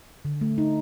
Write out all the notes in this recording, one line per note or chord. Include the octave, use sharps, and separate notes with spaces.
D3
A3
D#4